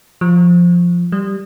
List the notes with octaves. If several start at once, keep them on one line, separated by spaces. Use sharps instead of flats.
F3
G3